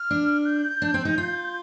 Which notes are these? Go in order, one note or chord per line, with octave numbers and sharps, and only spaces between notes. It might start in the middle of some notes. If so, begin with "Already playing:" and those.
Already playing: F6
D4
G6
D4
C4
D#4
F4